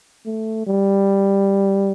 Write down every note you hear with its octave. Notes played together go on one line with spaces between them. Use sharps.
A3
G3